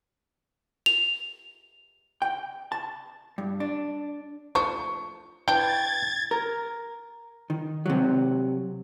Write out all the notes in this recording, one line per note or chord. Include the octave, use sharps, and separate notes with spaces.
F7
G5
A5
G2
D4
F3 A3 D4 C#6
E3 D4 G5 G#6 A6
A#4
D#3
C3 F#3